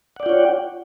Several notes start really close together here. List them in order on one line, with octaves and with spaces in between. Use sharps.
F#5 D5 G5 F4 C#5